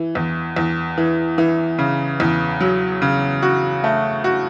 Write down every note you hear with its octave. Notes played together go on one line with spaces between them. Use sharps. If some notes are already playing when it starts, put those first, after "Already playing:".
Already playing: E3
E2
E2
E3
E3
C#3
E2
F#3
C#3
F#4
A3
F#4